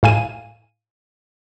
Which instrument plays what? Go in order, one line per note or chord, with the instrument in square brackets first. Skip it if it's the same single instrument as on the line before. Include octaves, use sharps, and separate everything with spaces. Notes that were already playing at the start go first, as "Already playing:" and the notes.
[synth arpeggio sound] A2 F5 G#5 D#7